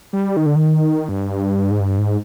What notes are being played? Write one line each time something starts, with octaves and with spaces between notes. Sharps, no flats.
G3
D#3
D3
D#3
G2
G#2
G2
G#2